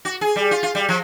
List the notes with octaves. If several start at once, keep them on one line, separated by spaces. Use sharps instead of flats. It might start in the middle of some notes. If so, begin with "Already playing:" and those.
F#4
G#4
G3
F4
F4
G3
F3